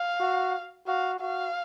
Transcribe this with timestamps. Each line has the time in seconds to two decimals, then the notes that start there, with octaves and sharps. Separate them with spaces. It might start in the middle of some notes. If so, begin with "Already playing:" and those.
Already playing: F5
0.20 F#4
0.87 F#4 F5
1.20 F#4 F5